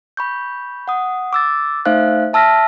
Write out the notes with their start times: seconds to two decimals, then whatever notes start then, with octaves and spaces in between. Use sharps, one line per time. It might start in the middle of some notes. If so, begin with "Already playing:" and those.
0.17 B5 C#6 G6
0.88 F#5 D#6
1.33 D6 E6 A6
1.85 A3 D#4 C5 E5 F5 F#6
2.33 E5 A5 E6 F6 A#6 B6